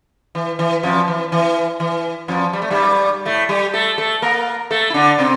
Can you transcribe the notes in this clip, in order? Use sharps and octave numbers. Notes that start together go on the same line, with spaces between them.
E3
E3
F2 F3
E3
E3
E3
F2 F3
G3
A3
G2 G3
A2 A3
G3 G4
A3 A4
A3 A4
A#3 A#4
A3 A4
E4
D3 D4
C3 C4